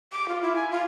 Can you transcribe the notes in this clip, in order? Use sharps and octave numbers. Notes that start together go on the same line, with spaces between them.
D6
F4
E4
G#5
F4